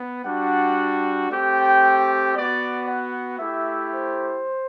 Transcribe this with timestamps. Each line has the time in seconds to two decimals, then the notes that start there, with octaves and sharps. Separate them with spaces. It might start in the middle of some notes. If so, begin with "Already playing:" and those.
Already playing: B3
0.25 G3 D4 F#4 F#5
1.29 A3 C4 G4 G5
2.34 B3 F#4 D5
2.87 F#5
3.39 A3 E4 G4 E5
3.92 C5